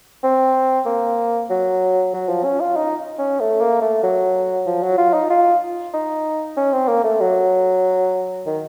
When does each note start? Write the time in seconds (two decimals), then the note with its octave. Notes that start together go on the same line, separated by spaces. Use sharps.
0.24 C4
0.86 A#3
1.50 F#3
2.14 F#3
2.29 F3
2.44 C#4
2.61 F4
2.76 D#4
3.19 C#4
3.40 A3
3.61 A#3
3.81 A3
4.03 F#3
4.66 F3
4.83 F#3
4.98 F4
5.14 D#4
5.30 F4
5.94 D#4
6.57 C#4
6.73 C4
6.88 A#3
7.04 A3
7.21 F#3
8.46 D#3